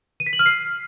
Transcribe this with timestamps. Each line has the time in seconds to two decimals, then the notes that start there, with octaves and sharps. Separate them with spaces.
0.20 D#7
0.26 B6
0.33 F#7
0.39 F6
0.46 C7